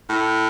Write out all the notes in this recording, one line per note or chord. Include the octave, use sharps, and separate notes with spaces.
A2